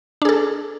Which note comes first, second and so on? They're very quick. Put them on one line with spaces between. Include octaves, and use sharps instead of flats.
D4 G#4 A4